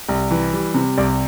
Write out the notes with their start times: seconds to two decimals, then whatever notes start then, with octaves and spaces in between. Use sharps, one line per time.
0.09 C2
0.31 E3
0.53 G3
0.74 C3
0.98 C2 D5